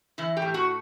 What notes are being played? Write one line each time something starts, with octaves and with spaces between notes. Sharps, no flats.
E3 E4
G4
A2
F#4